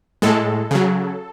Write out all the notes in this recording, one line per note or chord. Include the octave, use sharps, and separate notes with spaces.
A2 G#3 A4
C#3 F#3